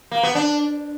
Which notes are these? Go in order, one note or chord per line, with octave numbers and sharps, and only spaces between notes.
A#3
B3
D4